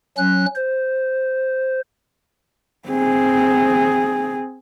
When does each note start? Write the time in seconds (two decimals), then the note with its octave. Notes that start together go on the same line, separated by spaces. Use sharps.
0.17 F#3 C#4 F#6
0.55 C5
2.89 C4 G#4